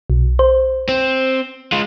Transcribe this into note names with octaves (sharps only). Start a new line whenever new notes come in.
B1
C5
C4
G#3 F4